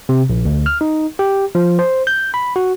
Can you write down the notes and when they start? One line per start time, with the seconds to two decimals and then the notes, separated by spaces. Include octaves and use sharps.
0.09 C3
0.29 A#1
0.45 D2
0.66 F6
0.81 D#4
1.19 G4
1.55 F3
1.79 C5
2.07 G6
2.34 B5
2.56 F#4